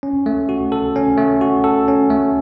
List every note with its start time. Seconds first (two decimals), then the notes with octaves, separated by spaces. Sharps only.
0.03 C#4
0.26 A3
0.49 F#4
0.72 A4
0.96 C#4
1.18 A3
1.41 F#4
1.64 A4
1.88 C#4
2.10 A3